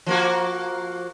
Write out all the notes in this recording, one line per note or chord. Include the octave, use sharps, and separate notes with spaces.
F3 A#3 F#4